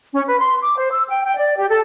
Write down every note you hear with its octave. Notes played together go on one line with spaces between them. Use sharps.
C#4
B4
C6
D6
C5
E6
G5
G5
D5
G4
A4